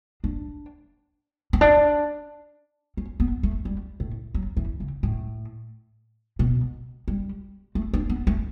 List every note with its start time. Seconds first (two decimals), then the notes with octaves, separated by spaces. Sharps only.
0.24 D4
1.53 C#4
1.61 D4
2.97 C#4
3.20 B3
3.43 A3
3.65 G3
4.00 A2
4.34 F#3
4.57 E3
4.80 C#3
5.03 A2
6.39 B2
7.08 G3
7.75 A3
7.94 D4
8.10 B3
8.27 A3